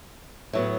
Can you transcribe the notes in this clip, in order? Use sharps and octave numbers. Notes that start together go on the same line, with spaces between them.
A2 F#3 B3